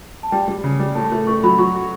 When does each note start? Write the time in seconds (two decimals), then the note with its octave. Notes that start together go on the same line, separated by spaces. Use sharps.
0.23 A5
0.32 G3 G5
0.48 G3
0.64 C#3
0.79 G3
0.95 A2 A5
1.12 A3
1.27 A3 C#6
1.43 F#3 B5
1.58 F#3 C#6
1.74 F#4